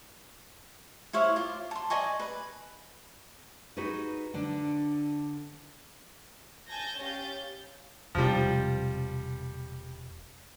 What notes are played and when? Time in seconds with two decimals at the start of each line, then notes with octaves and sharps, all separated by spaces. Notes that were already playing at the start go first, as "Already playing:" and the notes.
1.13 E4 C5 C#5 F5
1.36 F4 D6
1.71 A5 C6
1.90 D5 D#5 G#5 C#6
2.20 B4
3.77 D#4 F#4 G#4 B4
4.34 D3 D4 A4
6.68 G#5 A5 G6 G#6 A#6
7.02 C#4 G4 F5 G6 A6
8.15 E1 C3 F3 G3